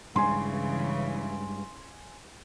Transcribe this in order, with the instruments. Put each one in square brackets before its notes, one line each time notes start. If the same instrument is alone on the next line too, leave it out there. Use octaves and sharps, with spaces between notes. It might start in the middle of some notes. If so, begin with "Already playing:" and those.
[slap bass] G2 G#3 [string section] C#3 E3 [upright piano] G#5 C6